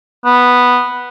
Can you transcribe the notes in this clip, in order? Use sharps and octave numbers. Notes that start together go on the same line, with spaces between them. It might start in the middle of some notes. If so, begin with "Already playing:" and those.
B3